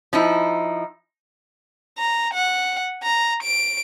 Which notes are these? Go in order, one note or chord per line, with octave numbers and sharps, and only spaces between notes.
F3 D#4 E4
A#5
F#5
A#5
D7